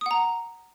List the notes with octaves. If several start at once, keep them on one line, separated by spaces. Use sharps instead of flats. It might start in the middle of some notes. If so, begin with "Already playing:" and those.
F#5 A#5 D#6